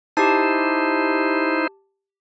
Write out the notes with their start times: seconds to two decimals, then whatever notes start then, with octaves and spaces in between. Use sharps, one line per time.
0.17 D#4 E4 G4 C5 A5